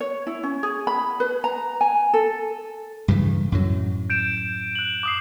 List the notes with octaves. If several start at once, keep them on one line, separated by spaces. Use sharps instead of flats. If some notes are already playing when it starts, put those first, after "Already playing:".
C#5
E4
C#4
G#4
B5
B4
A#5
G#5
A4
G2 C#3 E3
F#2 A2 F#3
G6 D7 E7
F#6 F#7
D6 D#6 C7